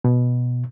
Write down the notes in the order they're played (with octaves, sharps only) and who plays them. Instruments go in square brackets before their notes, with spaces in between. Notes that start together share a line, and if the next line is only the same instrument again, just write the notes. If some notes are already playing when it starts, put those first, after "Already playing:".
[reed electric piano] B2